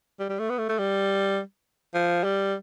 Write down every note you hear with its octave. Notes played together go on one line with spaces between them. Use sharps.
G3
G3
A3
B3
A3
A3
G3
F3
G3